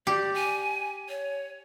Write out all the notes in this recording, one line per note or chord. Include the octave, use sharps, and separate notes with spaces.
G4 D5
G#5
C#5